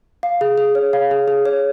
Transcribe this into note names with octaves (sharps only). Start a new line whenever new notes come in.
F5
G#4
G#4
C#5
F5
G#4
G#4
C#5